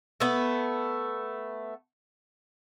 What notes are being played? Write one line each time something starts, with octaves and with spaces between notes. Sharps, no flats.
A3 B3